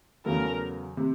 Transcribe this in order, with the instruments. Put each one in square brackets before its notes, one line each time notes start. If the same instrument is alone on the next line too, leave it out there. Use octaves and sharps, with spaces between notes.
[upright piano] E2 C#3 F#3 A3 [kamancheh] A#4
[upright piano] C3